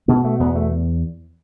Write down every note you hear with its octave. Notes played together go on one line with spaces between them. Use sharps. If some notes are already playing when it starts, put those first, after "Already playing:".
B2 B3
A3
E2 B3
A3